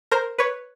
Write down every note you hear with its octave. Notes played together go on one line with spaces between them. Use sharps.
A#4 C5
B4 C#5